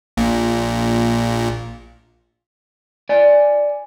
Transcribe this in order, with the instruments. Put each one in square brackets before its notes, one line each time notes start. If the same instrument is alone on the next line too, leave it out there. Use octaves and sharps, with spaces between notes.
[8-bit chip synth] A#1 A#2
[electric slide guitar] D5 G#5